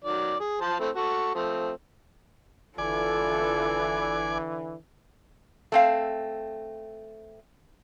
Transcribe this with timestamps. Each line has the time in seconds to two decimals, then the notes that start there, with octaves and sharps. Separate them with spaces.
0.04 D#3 F#3 D5
0.40 G#4
0.61 F3 C5 A5
0.80 A3 C4 E4
0.95 F#4 A4 C#6
1.35 F3 A3 C4
2.78 G1 D3 E3 F4 A4 D5 G#5
5.72 A3 C4 F5